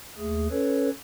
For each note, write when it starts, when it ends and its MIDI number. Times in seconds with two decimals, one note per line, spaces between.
0.18 0.47 39
0.18 0.47 57
0.18 0.47 68
0.50 0.90 61
0.50 0.90 69
0.50 0.90 71
0.50 0.90 73